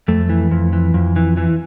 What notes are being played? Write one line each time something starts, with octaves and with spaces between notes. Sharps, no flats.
F2 A3
E3
F2
E3
F2
E3
E3